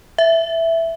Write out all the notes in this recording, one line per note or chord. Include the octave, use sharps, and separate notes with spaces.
E5